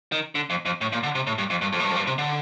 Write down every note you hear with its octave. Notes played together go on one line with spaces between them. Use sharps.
D#3
D3
F2
F2
A2
A#2
D3
C3
A2
G2
F2
G2
F2
A2
G2
F2
G2
C3
D3